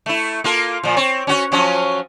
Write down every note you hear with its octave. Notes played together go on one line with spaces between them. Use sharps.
A3 E4
A#3 F4 A4
A#2 F3
C4 C#5
C#4 F#4 C#5
F3 F#3 C#4